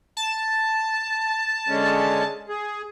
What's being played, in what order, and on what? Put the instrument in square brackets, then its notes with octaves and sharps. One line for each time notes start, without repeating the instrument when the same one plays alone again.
[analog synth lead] A5
[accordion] D3 G#3 C#4
G#4